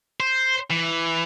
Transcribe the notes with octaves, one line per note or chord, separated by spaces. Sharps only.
C5
E3